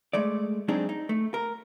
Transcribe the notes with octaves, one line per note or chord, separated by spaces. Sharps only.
G#3 A3 D5
F#3 G#3 C4 D4 D#4 G#4
D#4
A3
A#4